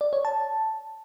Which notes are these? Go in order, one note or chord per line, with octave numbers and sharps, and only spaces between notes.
D5
C#5
A5